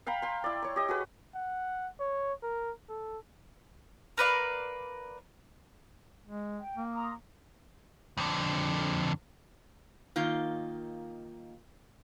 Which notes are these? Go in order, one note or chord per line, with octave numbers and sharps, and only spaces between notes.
F5 G5 A#5 B5
G5 C6
E4 D5
C#5 C#6
G4 D#5
F#4 G#4 B4
F#5
C#5
A#4
A4
A#4 B4 D5 F5
G#3
G5
A#3
A#5 C6 D#6
F2 D3
D#3 A#3 D#4 F4